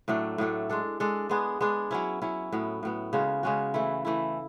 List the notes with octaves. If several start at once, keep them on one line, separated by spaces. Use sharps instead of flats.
A2 F#3 A3 D4
A2 F#3 A3 D4
G#3 D4 A4
G#3 D4 A4
G#3 B3 D4 G#4
G#3 B3 D4 G#4
F#3 C#4 E4
F#3 C#4 E4
A2 F#3 B3
A2 F#3 B3
C#3 G#3 C#4 F#4
C#3 G#3 C#4 F#4
E3 A3 E4
E3 A3 E4